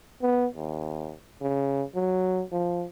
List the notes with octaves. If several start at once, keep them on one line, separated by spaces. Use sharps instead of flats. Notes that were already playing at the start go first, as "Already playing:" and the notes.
B3
D#2
C#3
F#3
F3